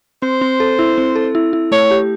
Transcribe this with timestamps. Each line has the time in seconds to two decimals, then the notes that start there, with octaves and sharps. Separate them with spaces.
0.22 C4 C5
0.41 C4
0.60 A4
0.79 E4
0.98 C4
1.16 A4
1.35 E4
1.53 E4
1.72 A3 C#5
1.91 G4